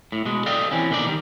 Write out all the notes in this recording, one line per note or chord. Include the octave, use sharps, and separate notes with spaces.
A2
B2 G#3
A4 D5 D#5 F5 G5
E3 C4 C#4
B2 D3 A#3 D#4 D5
D#3 G3